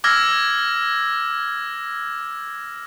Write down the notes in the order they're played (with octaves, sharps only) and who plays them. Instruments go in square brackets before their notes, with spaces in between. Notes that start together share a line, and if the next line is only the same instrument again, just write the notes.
[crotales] D6 E6 F6 G#6 A#6